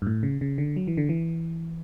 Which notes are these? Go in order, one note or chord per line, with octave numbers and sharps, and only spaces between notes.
G2
A2
C#3
C#3
D3
F#3
E3
D3
E3